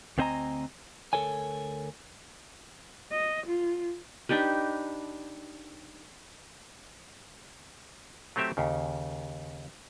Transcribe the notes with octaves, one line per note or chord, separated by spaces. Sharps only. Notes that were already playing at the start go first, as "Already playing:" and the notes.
D2 B3 C4 D#5 G#5 A#5
D2 A4 A#4 C#5 G#5
D#5
F4
D4 D#4 G4 B4
F#3 A3 C4 G4 E5
D#2 C#3